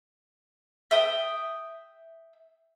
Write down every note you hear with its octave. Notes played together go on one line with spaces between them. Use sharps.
E5 G5 D#6